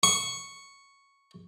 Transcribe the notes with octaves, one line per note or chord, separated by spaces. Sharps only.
C#6